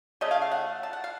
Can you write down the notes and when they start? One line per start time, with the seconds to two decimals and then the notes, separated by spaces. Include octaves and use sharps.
0.21 C#3 A3 C#4 D#5
0.31 F5
0.42 F5
0.51 F#5
0.83 A5
0.93 F#5
1.04 F5